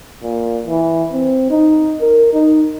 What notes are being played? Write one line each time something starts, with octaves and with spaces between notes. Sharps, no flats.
A#2
E3
C4
D#4
A#4
D#4